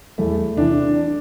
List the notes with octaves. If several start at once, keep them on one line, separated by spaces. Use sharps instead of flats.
E2 A3
C3 E3 D4